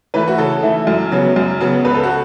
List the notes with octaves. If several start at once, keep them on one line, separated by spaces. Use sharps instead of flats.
E3 A3 E4 B4
F#4
C#3 A4
E3 A3 E4
F#2
C#3 F#3 B3
F#2
C#3 F#3 B3
C#2 B4
A4
F#4